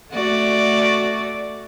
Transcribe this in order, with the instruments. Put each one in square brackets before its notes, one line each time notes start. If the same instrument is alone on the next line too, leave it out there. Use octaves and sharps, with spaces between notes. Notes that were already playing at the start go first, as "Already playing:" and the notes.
[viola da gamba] A3 F#4 D5